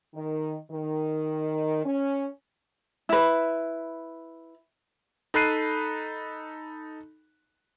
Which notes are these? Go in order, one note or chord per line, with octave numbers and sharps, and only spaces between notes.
D#3
D#3
C#4
E4 B4
D#4 A4 B5 F#6 C7 D#7